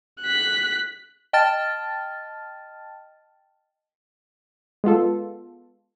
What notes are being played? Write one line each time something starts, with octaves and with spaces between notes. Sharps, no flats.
F#6 B6
D#5 G5 A5 F6 A6
G#3 B3 F4 A4